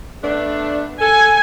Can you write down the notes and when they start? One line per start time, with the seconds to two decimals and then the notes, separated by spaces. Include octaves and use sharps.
0.23 A3 B3 D4
1.01 A4 G#5